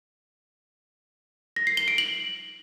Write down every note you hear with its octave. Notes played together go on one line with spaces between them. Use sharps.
A#6
C7
G7
D7
F#7